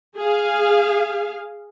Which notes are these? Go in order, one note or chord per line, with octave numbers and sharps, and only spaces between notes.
G#4 F5